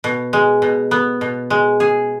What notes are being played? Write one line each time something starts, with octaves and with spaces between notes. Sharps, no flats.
B2
G#3
B2
B3
B2
G#3
G#4